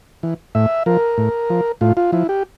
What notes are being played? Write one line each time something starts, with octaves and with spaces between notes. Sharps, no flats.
E3
A2 E5
F3 A#4
A2
F3
A2 F4
F4
F3 E4
G4